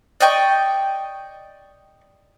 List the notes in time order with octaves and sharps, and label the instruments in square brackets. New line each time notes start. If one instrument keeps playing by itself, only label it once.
[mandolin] D5 D#5 G5 C#6